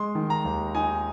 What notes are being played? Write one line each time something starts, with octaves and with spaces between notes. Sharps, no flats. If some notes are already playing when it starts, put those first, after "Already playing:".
Already playing: G#3 C6
D#3
A#5
D#2
D#4 G#5